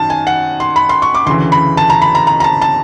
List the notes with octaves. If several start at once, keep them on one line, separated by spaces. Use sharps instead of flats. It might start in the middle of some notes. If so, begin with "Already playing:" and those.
Already playing: F#2 D#3 A5
G#5
F#5
C6
B5
C6
C#6
D6
D2 C#3 E3 C6
B5
A5
A#5
B5
A#5
A#5
A#5
A5
A5